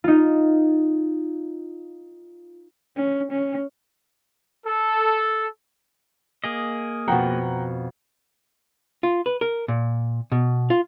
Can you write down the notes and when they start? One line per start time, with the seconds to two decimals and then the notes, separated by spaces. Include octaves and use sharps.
0.04 D#4 F4
2.96 C#4
3.32 C#4
4.65 A4
6.44 A#3 G#4 D#5
7.08 F2 B2 F#5 G5 A#5
9.03 F4
9.26 B4
9.41 A#4
9.68 A#2
10.32 B2
10.70 F4